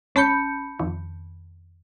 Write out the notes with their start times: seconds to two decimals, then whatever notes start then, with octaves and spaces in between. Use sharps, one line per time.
0.15 G#1 C#4 A5 B5 G6 C#7
0.79 F2 D#3